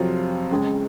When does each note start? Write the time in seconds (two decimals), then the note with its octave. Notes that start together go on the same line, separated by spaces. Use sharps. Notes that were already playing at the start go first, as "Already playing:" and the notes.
Already playing: F2 C3 F#3 C4 F4
0.51 C#2 C#3 G#3